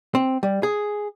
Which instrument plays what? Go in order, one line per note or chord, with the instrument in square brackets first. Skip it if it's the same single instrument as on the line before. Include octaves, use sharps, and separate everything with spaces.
[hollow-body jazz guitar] C4
G3
G#4